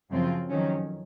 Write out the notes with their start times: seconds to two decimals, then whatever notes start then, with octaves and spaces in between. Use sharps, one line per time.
0.10 F#2 C#3 F3 C4 F4
0.50 F2 D#3 F#3 C#4